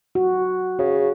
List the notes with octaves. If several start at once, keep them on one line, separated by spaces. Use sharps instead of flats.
F#4
C#3 F#4